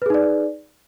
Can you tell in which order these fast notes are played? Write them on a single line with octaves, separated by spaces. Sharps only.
B4 G#4 D#4 D5